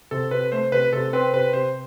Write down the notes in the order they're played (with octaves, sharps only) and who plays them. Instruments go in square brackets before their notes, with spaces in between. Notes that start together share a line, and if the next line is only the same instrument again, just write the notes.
[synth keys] C3 [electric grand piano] A4
[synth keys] C3 [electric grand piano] B4
[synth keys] A3 [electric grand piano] C5
[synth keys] C3 [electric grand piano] B4
[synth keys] C3 [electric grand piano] A4
[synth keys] C4 [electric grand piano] B4
[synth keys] C3 [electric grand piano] B4
[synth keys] C3 [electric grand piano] C5